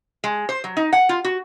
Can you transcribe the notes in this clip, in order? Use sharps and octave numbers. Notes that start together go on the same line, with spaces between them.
G#3
C5
F#3
D#4
F#5
F4
F#4